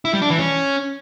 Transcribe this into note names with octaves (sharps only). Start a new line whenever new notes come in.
E4
G3
D4
E3
C#4